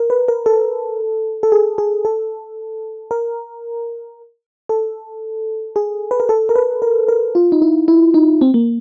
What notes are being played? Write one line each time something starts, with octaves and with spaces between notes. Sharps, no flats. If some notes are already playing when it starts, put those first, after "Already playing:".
Already playing: A#4
B4
A#4
A4
A4
G#4
G#4
A4
A#4
A4
G#4
B4
A#4
A4
A#4
B4
A#4
A#4
F4
D#4
E4
E4
D#4
C4
A#3